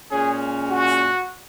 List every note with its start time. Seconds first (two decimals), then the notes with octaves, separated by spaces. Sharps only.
0.11 A#2 G#3 C#4 G#4
0.70 F#4